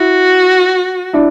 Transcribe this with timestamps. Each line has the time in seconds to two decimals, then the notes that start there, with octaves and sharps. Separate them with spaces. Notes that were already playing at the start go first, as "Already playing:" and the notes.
Already playing: E4 F#4
1.13 D4 E4